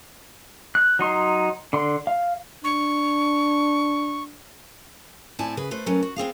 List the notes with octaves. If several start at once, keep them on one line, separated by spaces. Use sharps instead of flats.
F#6
F#3 D#4 C6
D3 C6
F5
D4 C#6
A2 C4 E4 D5 G#5 A5
C#3 G#4 B4
A3 B4 C5
F#3 A3 C#4 A#4 B4
F#4
B3 C4 G#4 F5